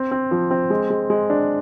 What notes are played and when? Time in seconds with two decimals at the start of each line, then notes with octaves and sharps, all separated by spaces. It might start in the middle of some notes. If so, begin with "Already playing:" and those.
Already playing: C4
0.11 C4
0.31 F3
0.51 C4
0.70 G#3
0.90 G#3
1.10 G#3
1.30 D4